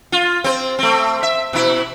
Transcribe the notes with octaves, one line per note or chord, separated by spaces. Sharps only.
F4
C4 C5
A3 C4
E5
B2 E4